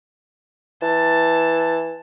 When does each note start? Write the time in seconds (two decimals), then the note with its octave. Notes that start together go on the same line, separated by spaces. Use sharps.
0.82 E3 A5